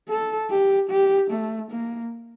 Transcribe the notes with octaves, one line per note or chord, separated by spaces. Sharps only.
A4
G4
G4
A3
A#3